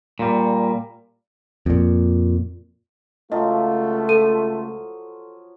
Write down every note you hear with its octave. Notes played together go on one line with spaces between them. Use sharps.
A#2 G3
F2 A#2
C#2 F3 F#3 A3 F4 D#5
A4 D#7